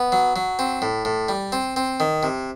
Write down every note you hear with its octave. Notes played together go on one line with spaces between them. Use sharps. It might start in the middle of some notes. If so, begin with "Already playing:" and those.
Already playing: B3
F#3
F#3
C4
A2
A2
G3
C4
C4
D#3
C3